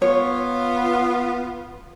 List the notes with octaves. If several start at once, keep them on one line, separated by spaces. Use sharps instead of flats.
B3 F4 C#5